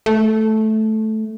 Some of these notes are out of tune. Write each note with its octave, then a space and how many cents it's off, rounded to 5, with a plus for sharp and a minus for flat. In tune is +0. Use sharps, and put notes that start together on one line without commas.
A3 -10